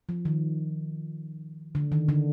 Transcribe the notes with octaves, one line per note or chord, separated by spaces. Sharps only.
F3
D#3
D3
D#3
D3